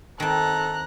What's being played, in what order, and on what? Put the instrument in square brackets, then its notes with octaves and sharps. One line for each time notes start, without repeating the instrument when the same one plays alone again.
[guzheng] D#3 C4 [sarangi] A4 [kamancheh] A#5 F#6